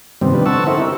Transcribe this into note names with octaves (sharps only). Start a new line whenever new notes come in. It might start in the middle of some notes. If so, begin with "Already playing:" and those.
G2 C3 D#3 G3 B3 C4
D#3 F3 B3 D4 B4
D3 C4 F#5 A5 C#6 E6
D#4 E4 A4 A#4 C5 E5
G4 A#4